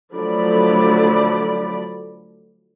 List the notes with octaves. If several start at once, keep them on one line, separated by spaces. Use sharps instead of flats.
D3 F3 F#3 A3 D5 B5